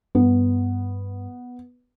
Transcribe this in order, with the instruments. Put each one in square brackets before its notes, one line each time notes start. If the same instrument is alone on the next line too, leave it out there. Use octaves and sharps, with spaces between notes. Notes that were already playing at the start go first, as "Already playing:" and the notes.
[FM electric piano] G2 [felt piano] B3